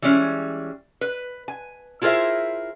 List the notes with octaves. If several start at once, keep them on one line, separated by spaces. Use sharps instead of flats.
E3 G3 G#3 C#4
B4
G#5
E4 F4 G#4 A#4 C5 E5